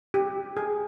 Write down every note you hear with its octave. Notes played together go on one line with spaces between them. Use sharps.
G4
G#4